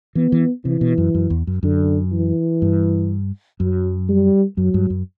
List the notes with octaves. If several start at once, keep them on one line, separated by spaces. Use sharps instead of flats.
E3 B3
E3
C3 E3
B2
F#2
F#2
E2
F#2
F#2 D3
E3
G2
F#2 F#3
G3
F#2 F#3
G2
F#2